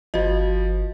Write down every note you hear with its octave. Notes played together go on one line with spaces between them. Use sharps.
G1 F3 F#4 D#5